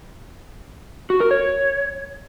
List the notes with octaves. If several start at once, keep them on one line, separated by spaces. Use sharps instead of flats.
F#4
A#4
C#5